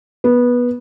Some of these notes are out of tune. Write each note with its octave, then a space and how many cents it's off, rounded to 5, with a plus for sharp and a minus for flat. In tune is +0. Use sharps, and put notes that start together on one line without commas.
B3 -15